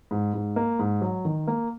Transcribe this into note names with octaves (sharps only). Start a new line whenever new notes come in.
G#2
G#2
A#3
G#2
F#3
D#3
A#3